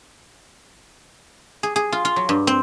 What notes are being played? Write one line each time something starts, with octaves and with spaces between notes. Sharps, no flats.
G#4
G#4
F4
F4
F#3
G2
C4